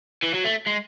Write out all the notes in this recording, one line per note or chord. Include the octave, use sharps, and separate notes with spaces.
E3
F#3
A3
G#3